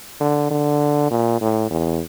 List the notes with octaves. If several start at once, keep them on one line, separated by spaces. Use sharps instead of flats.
D3
D3
A#2
A2
E2